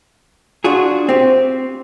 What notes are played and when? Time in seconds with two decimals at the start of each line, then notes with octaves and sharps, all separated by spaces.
0.64 D4 F4 F#4 G#4
1.09 C4 G4